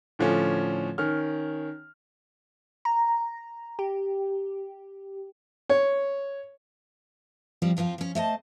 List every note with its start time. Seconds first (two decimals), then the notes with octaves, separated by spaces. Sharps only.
0.19 A2 D3 F3 A3 C#4
0.98 D#3 C#4 F6
2.85 A#5
3.79 G4
5.70 C#5
7.62 F3 G3 C4
7.77 F2 F3 C4 F4
7.98 F3 C#4
8.15 A3 C5 D#5 A5